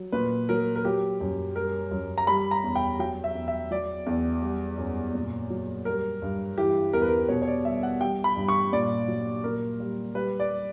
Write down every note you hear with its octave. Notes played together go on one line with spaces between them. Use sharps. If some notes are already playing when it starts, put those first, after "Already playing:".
Already playing: F#3
A#2 B4
F#3 A#4
A#4
F#3 G4
F#2
G3 A#4
F#2
A#5
G3 B5
A#5
E2
G5
F#3 G5
E5
E2
E5
F#3 D5
E2
G3
F#2
A#2
F#3
G3 A#4
G2
E3 G4
E2 A#4
B4
A#4
B2 C#5
C#5
D5
G3 E5
F#5
G3 G5
B5
G2
C#6
A#2 D5
F#3
A#2 A#4
G3
G3 B4
D5